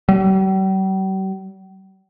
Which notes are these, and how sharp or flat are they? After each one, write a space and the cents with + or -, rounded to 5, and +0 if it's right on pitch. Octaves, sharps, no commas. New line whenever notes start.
G3 -45